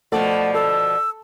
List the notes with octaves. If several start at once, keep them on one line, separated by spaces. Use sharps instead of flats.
B2 F3 A3 D5 F#5
A4 E6